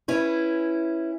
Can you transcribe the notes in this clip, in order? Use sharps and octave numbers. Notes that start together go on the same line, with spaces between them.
C#4 E4 B4